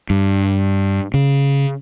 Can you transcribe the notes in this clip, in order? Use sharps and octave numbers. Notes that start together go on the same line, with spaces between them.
G2
C#3